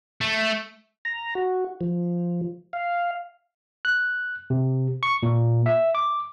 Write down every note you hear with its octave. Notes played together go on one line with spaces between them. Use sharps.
A3
A#5
F#4
F3
F5
F#6
C3
C#6
A#2
E5
D6